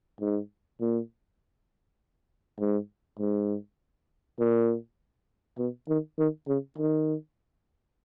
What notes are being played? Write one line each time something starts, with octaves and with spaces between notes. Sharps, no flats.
G#2
A#2
G#2
G#2
A#2
B2
D#3
D#3
C#3
D#3